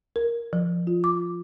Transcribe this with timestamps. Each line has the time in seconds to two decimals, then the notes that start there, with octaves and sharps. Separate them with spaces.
0.16 A#4
0.53 F3
0.87 F4
1.04 D6